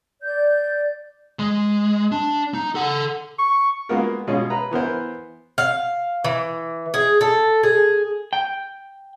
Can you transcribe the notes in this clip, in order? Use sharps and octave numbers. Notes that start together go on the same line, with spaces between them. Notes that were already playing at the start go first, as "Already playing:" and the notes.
D5 G6
G#3
D4
D#4
A4 F#5
C#6
G#3 A#3 B3 F4 F#4 A#4
B2 G#3 C#4 F4
B4 A#5
E3 B3 A#4 C5
F5
E3
G#4
A4
G#4
G5